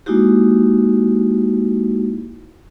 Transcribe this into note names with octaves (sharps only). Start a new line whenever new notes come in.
G#3 A#3 D#4 E4 F#4 G4